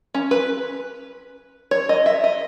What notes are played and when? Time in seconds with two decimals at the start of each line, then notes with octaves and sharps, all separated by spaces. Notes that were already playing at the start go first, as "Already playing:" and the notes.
0.14 C#4
0.31 B4
1.71 C#5
1.89 D#5
2.06 E5
2.24 D#5